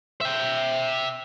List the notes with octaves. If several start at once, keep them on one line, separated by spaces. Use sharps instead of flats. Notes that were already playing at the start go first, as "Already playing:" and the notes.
E5 G5